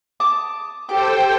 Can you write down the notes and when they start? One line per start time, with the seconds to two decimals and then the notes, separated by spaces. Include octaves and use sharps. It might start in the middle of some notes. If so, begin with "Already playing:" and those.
0.20 A5 D6 D#6
0.89 G4 A4 C5 G5 D6